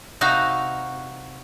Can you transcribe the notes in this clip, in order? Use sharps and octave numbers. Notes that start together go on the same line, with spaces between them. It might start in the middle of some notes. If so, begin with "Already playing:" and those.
C3 D#4 F#4 F5 A#5